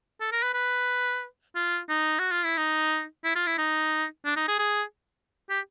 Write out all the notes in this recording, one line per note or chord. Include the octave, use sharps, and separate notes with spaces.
A4
A#4
B4
B4
F4
D#4
F#4
F4
E4
D#4
E4
F4
E4
D#4
D4
D#4
G#4
G#4
G4